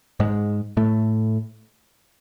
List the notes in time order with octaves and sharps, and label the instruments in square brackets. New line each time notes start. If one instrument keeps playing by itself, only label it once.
[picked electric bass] G#2 G#3
A2 A3